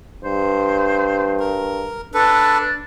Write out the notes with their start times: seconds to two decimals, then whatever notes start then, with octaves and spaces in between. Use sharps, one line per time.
0.24 G2 C5
1.40 A#4
2.14 D4 A4 B4